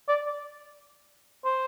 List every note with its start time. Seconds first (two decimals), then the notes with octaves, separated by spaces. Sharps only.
0.08 D5
1.45 C5